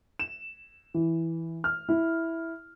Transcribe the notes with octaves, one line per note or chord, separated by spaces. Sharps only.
E7
E3
F6
E4